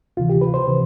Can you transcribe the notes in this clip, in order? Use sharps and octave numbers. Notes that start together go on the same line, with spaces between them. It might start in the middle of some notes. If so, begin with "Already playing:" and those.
D2 C3 E3 F4
G4
B4
C5
C3 E3